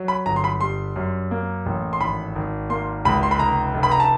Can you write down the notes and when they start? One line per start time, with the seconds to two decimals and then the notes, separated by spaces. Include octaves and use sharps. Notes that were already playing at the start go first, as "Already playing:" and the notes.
Already playing: F#3
0.08 B5
0.26 G1 A#5
0.36 C6
0.44 B5
0.61 G3 C6
0.96 F#2
1.31 A#3
1.66 A1
1.93 C6
2.00 G#1 B5
2.36 G#1
2.70 A#3 C6
3.05 C#2 B5
3.23 C6
3.31 B5
3.39 F1 A#5
3.74 F1
3.83 B5
3.91 A#5
4.00 A5